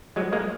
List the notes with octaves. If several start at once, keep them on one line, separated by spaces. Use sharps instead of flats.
F#3 G#3
G#3 A#3